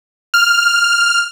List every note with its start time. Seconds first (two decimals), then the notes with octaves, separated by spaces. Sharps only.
0.34 F6